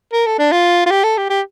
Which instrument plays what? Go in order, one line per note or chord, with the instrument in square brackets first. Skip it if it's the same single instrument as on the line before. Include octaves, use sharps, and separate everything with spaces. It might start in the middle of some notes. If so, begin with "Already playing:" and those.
[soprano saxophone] A#4
A4
D4
F4
F4
G4
A4
G4
G4